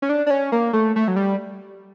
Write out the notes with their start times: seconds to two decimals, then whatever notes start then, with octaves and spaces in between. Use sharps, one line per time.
0.02 C#4
0.09 D4
0.26 D4
0.30 C#4
0.52 A#3
0.73 A3
0.96 A3
1.08 F#3
1.16 G3